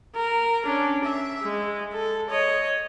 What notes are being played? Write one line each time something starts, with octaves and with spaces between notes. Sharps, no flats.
A#4
C#4 D4
E5
G#3
A4
C#5 D#5